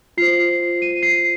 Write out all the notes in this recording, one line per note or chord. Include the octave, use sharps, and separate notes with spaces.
F4 C5 C7
D#7
C7